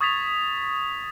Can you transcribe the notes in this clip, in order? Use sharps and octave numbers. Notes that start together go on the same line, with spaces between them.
C#6 D#6 G#6 A6 B6 F7